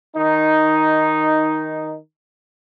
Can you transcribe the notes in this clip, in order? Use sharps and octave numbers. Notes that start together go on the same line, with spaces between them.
D#3 D#4